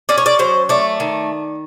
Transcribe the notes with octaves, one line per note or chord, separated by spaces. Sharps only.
C#4 D5
C#5
D5
F#3 C5
A3 D5
D#3